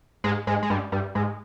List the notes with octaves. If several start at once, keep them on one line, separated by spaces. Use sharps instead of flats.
G#2 G#3
G#2 G#3
G#3
G2 G3
G2 G3
G#2 G#3